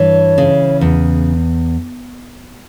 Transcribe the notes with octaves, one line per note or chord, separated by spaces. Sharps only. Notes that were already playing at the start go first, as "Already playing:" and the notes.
Already playing: G2 E3 C#5
C#3
E2